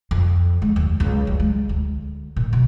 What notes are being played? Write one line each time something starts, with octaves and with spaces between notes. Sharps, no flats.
F2
G#3
D#2
C#2
G3
G#3
D2
A#2
B2